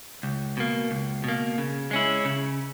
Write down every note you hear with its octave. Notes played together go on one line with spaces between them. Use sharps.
C#2
B2 A#3
C#2
B2 A#3
C#3
G#3 C#4 E4
C#3